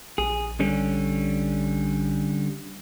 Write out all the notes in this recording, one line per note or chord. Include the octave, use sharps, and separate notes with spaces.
A#1 G#4
D3 G3 C#4